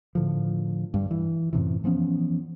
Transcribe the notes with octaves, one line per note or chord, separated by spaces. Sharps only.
A2 D3 F3
G2 G3
E3
F#2 A2 C3 E3
E3 F3 B3 C#4